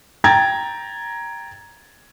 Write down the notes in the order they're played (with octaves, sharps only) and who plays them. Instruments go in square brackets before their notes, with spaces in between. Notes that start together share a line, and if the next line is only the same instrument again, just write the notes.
[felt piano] G5 A#5 G#6 A6